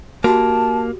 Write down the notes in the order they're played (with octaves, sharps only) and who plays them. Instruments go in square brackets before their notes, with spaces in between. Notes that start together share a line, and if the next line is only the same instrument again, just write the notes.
[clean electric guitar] A#3 [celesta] F#4 G4 [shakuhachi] A5